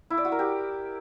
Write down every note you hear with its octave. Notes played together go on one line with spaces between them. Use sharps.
E4
D5
F#4
A#4
G4